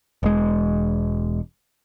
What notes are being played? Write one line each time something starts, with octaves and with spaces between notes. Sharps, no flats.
E1 G#3